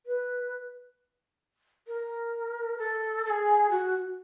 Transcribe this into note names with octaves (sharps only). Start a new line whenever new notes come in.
B4
A#4
A4
A4
G#4
F#4